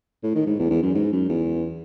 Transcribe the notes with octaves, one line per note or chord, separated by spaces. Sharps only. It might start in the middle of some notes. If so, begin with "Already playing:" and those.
A2
D#3
G#2
E2
E2
F#2
G#2
F#2
E2